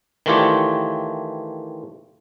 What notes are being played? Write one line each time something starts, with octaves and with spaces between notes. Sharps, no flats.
D#3 E3 A3 F4 G4 C#5